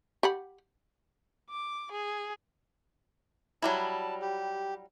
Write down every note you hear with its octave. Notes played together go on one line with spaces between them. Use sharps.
G4 F#5 B5
D6
G#4
F#3 G3 E4 A5
G4